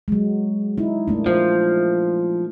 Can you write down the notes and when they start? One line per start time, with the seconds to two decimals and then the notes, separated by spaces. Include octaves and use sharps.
0.08 F#3 G#3
0.78 D#4 E4
1.08 A3 A#3 D4
1.26 F3 F4